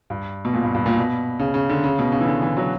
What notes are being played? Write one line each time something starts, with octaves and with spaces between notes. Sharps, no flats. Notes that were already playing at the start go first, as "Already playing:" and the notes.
G2
B2
A#2
G2
G2
A#2
B2
C#3
C#3
D3
C#3
B2
C#3
E3
D3
E3
F#3